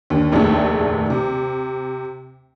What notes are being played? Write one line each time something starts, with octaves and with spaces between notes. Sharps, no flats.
D#2 D3
F1 A#1 D#2 D#3 G#3 A3
C3